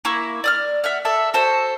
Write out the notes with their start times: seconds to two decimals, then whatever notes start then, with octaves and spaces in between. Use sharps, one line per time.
0.05 A#3 E4 C#6
0.44 D5 D#6 F6
0.84 E5 F#5 F6
1.05 A4 D5 E5
1.34 F#4 A4 C5